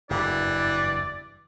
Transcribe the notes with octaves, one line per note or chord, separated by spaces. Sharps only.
F#1 E2 G2 E3 D5